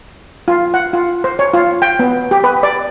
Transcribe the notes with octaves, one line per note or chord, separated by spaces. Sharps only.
F4
F#5
F4
C5
C#5
F4
G5
B3
G4
B4
D5